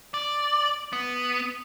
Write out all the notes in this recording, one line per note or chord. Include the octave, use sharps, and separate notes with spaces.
D5
B3